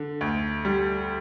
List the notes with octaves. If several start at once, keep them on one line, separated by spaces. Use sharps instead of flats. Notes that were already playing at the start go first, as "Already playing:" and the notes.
Already playing: D3
D2
G3